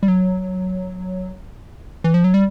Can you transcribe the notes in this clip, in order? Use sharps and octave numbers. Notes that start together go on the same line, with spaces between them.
G3
F#3
E3
F3
F#3
G3